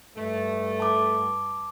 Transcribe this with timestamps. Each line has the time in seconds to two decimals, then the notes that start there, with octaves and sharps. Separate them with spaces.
0.17 G2 A3
0.80 A5 D6